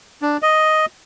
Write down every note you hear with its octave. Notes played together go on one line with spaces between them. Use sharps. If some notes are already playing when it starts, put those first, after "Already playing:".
D4
D#5